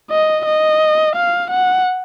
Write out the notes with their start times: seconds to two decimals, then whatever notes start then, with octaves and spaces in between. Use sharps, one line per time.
0.10 D#5
0.45 D#5
1.15 F5
1.51 F#5